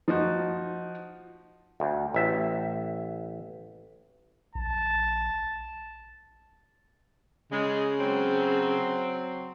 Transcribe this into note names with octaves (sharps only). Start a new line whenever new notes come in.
F3 D#4 F#4
D2
A1 E5
A#1 A5
C#3 G#3
F#3 C4